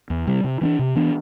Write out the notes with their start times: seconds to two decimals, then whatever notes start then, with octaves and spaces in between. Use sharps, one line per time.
0.10 E2
0.27 C3 G3
0.44 C3
0.61 E3 B3 D4
0.79 C3
0.95 E3 B3 D4